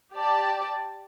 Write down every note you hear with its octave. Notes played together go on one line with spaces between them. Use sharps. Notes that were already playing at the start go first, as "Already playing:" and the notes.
G4 D5 A5